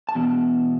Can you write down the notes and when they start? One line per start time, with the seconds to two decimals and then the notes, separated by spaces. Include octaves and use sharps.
0.09 A5
0.15 E2 B2